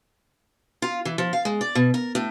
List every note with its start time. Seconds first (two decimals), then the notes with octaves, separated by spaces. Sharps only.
0.82 F4
1.05 E3
1.18 F3
1.33 F5
1.45 G#3
1.61 D5
1.75 B2
1.94 A#4
2.15 A2